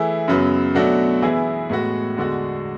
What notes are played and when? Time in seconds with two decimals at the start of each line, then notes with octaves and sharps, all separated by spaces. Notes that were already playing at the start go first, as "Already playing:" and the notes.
Already playing: E3 A3 E4 G#4
0.28 F#2 C#3 F#3 B3
0.75 B2 F#3 A3 D4 F#4
1.22 E3 B3 E4 G#4
1.70 A2 G#3 B3 F#4
2.17 E2 D3 G#3 D4 F#4